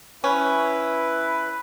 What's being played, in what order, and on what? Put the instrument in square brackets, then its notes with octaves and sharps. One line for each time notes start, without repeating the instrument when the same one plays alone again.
[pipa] C#4 [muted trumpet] E4 [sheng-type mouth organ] B4